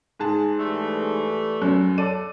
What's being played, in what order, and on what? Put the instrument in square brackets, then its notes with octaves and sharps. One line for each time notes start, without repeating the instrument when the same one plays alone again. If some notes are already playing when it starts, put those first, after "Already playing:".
[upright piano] G#2 G#4 A5
[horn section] E3 G3 A3
[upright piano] F#2 F#3
A4 D5 D#7